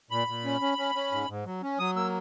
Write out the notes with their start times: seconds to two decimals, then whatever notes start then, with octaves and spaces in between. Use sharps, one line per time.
0.11 A#2 B5
0.28 A#2
0.45 C#4
0.61 C#4
0.78 C#4
0.95 C#4
1.12 G#2
1.28 G#2
1.46 F#3
1.63 C#4
1.79 F#3 D#6
1.96 A#3 E6